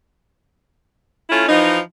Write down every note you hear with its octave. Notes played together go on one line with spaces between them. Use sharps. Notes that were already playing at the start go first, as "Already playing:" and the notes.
A3 C#4 E4 F4
E3 F3 D#4